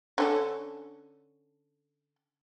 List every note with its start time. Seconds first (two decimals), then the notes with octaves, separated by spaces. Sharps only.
0.18 D3 C#4 A4